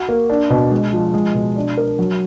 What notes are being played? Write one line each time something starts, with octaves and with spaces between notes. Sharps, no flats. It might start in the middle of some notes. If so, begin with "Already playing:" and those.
Already playing: F#4
A#3
D4
B2
G#3
F3
G#3
B2
D4
A#4
F#3